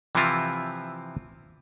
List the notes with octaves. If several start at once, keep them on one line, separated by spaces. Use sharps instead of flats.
C3 E3 F3 C4 E4 F4